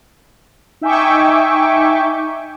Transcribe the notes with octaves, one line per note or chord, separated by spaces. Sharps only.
D#4 E5 G5 G#5 C#6 D6